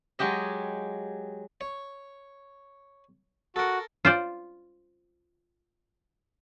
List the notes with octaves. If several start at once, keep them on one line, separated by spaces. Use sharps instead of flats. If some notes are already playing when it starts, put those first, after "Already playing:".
F#3 G#3 F#4 G4 D#5
C#5
F#4 A4 A#4
F4 C5 D5